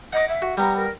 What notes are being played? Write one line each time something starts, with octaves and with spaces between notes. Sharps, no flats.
D#5 F#5 D6
E5
F#4
G3 B3 A#5
A#4